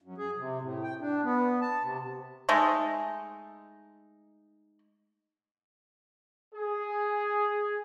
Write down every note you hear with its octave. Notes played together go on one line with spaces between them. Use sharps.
F#2
G#4
C3
A2
G5
D4
B3
A5
C3
G#3 A3 D#4
G#4